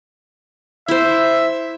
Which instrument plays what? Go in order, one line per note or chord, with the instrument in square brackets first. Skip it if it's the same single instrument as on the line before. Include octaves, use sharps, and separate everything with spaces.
[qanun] E4 C5 [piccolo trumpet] E5